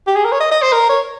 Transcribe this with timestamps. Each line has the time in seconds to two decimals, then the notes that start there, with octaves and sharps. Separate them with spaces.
0.08 G4
0.16 G#4
0.25 A#4
0.32 C#5
0.40 D#5
0.51 D#5
0.62 C5
0.72 A#4
0.89 C#5